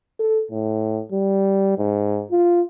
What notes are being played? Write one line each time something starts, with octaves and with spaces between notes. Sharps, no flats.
A4
A2
G3
G#2
F4